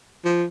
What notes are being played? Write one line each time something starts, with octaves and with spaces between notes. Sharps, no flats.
F3